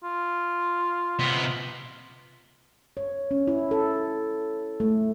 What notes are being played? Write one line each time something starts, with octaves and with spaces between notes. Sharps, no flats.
F4
C3 B3
C#5
C#4
E4
A4
A3